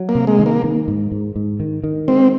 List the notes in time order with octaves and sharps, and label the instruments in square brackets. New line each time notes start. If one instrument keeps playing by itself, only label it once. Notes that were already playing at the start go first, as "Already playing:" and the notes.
Already playing: [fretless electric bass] F#3
[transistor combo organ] A#3
[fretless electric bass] C3
[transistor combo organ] G#3
[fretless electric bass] D#3
[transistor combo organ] A#3
[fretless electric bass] D#3
G#2
G#2
G#2
D#3
D#3
[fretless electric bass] G#3 [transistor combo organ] C4